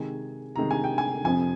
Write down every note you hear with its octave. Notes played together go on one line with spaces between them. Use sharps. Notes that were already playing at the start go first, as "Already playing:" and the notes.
Already playing: C3 D#3 G#3 G#5
C3 D#3 G#3 A#5
G#5
G5
G#5
F2 C3 F3 G#5